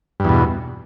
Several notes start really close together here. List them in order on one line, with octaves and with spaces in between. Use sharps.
G2 E2 B2